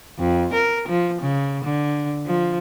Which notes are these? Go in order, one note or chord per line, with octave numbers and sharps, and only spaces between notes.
F2
A#4
F3
C#3
D3
F3